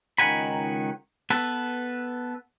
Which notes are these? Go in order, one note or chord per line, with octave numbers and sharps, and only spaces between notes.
C#2 D#3 D#4 F#5 G#5 B5
B3 A4 B4